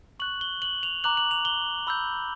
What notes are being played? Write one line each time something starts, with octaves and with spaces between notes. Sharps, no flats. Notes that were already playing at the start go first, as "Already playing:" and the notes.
C#6 F#6 F#7
G7
F#7
F7
A#5 D6 F#6 F#7
F#7
F7
G7
B5 E6 G6